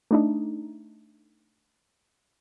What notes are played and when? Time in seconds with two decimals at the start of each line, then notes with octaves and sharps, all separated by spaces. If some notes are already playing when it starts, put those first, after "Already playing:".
0.11 A3 D4 D#4